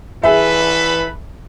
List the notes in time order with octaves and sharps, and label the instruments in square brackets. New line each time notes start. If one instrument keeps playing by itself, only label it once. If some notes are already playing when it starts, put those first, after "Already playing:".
[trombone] E3 [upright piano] G#4 E5 [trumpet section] A4 B4 B5